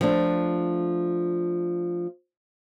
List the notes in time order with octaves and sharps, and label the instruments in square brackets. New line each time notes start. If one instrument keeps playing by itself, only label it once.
[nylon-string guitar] F3 A3 D4